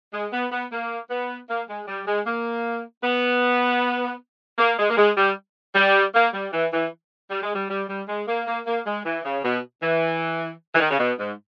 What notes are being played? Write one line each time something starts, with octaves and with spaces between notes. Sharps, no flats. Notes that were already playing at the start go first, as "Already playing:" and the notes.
G#3
B3
B3
A#3
B3
A#3
G#3
G3
G#3
A#3
B3
A#3
G#3
A#3
G#3
G3
G3
A#3
G3
E3
E3
G3
G#3
G3
G3
G3
G#3
A#3
A#3
A#3
G#3
E3
C#3
B2
E3
E3
D#3
C#3
B2
G#2